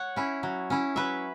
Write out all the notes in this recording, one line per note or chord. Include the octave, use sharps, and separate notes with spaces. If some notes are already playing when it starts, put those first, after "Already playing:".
Already playing: C#5 F#5
C#4 E4
F#3
C#4 E4
F#3 B4 E5